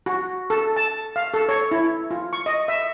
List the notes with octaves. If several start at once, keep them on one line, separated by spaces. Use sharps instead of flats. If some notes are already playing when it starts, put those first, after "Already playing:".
F#4
A4
A5
F5
A4
C#5
E4
F4
C#6
D#5
E5